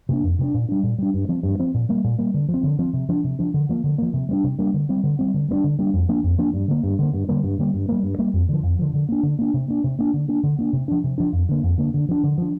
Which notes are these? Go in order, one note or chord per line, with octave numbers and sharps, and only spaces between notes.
C3 A#3 D4
F2
C3 A#3 D4
A#2
G3 D4
A#2
G3 D4
G2
F3 C4
G2
F3 C4
A#2
G3 A#3
A#2
G3 A#3
D3
F3
C4
D3
F3 C4
C3
F3 D4
C3
F3 D4
D3
F3 A#3
D3
F3 A#3
C3
G3 A#3 D4
C3
G3 A#3 D4
D3
G3 C4
D3
G3 C4
D3
G3 A#3 D4
D3
G3 A#3 D4
F2
F3 A#3 D4
F2
F3 A#3 D4
G2
D3 A#3
G2
D3 A#3
G2
D3 G3 A#3
G2
D3 G3 A#3
G2
G3 A#3
G2
G3 A#3
F2
D3 F3
F2
D3 F3
D3
A#3 D4
D3
A#3 D4
C3
A#3 D4
C3
A#3 D4
D3
A#3 D4
D3
A#3 D4
C3
F3 D4
C3
F3 D4
F2
D3 A#3
F2
D3 A#3
D3
F3 D4
D3
F3 D4